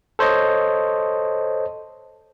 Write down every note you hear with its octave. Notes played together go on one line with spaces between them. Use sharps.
A4 C5 C#5 D#5